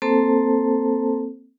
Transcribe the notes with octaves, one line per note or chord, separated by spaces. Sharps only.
A#3 C4 A4 C5 A5